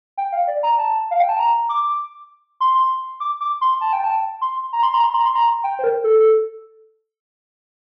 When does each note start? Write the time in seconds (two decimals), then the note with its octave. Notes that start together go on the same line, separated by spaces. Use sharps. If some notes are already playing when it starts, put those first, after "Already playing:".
0.18 G5
0.32 F5
0.47 D5
0.63 A#5
0.78 A5
1.11 F5
1.20 G5
1.29 A5
1.39 A#5
1.69 D6
2.60 C6
3.20 D6
3.41 D6
3.61 C6
3.81 A5
3.93 G5
4.04 A5
4.41 C6
4.73 A#5
4.83 C6
4.94 A#5
5.04 C6
5.14 A#5
5.25 C6
5.36 A#5
5.64 G5
5.79 C5
5.84 A#4
6.04 A4